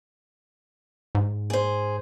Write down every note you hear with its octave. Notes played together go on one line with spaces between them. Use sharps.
G#2
G#4 C5